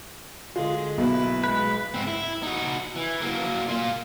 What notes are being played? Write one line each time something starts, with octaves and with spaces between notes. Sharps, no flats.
D3 G#3 F4
B1 A#3 E4 B4
G#3 B4
G#2 C4
E4
D#4 F#4
E3
F#3 A#3
A#3 F4